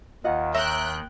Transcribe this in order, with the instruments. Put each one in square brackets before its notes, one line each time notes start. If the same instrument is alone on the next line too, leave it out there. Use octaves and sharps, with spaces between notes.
[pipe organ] D#2 D#3 [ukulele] F4 D#5 F#5
[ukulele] C#5 [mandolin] E5 A#5 [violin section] G5 F#6 G6